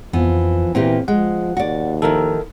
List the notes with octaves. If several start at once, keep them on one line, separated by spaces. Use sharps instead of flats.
F2 E3 F3 B3
A#2 E3 A#3 C4 G4
F3 G#3 F#5
D#2 F#4 D5
D#3 F3 E4 A4 A#4